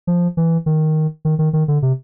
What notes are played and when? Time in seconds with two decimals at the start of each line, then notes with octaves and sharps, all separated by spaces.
0.07 F3
0.37 E3
0.66 D#3
1.25 D#3
1.39 D#3
1.53 D#3
1.68 D3
1.82 C3